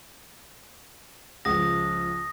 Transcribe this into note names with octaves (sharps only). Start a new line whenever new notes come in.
C#2 F3 D#6 A#6